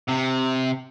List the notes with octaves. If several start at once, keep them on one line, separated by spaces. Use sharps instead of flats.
C3